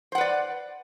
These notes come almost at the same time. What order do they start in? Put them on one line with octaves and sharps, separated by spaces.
C5 F#5 B4 D5